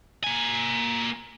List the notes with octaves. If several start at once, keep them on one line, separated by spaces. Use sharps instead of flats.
A#3 G#5